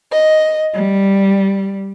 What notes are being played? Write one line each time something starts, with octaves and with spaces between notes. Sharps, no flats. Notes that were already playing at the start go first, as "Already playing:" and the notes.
D#5
G3